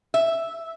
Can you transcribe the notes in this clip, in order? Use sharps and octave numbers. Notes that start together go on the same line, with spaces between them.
E5